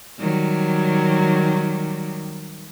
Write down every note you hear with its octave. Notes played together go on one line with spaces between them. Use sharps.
D#3 F#3 G3